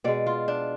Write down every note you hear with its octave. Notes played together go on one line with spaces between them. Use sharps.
B2 G#3 D5
F4
D4